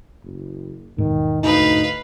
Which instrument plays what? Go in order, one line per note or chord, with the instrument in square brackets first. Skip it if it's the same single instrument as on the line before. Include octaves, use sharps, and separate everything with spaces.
[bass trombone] F#1
[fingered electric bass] E1 G#2 [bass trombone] D#3
[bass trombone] D2 [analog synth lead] D#4 [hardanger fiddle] B4 F5